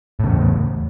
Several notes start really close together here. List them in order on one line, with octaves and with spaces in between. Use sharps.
A2 C#3 E2